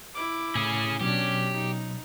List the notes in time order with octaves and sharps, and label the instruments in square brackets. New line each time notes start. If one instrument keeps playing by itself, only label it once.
[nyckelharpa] E4 D6
[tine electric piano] A2 [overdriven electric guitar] C#4 G#4
[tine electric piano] B2 F#3 [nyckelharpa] C#4 D4 [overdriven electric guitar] G4
[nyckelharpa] D#4